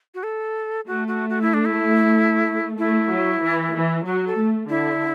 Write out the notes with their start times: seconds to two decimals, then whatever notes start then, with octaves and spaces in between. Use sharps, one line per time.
0.14 F#4
0.23 A4
0.87 A3 F#4
1.08 F#4
1.30 F#4
1.42 E4
1.54 D4
1.65 E4
2.78 A3 E4
3.10 F#3
3.42 E3
3.74 E3
4.06 F#3 F#4
4.27 A4
4.38 A3
4.69 D3 E4